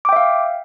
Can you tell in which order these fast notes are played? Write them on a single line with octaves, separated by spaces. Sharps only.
D6 G5 E5 F5